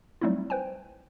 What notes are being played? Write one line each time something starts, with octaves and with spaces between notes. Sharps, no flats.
F#3 G3 A3 C4 D#4 E4
B4 C5 G5 G#5